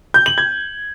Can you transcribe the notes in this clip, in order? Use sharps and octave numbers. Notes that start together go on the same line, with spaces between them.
G6
F#7
G#6